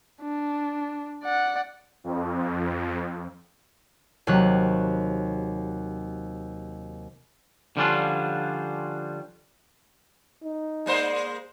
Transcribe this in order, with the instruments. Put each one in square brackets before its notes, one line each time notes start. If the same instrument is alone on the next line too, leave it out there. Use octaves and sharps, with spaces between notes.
[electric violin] D4
D5 F#5
[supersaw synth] F2
[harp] D#2 C3 F#3 F#6
[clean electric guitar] D3 F3 G3 C#4 D4 F4
[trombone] D#4
[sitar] G#3 A#3 C5 [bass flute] D5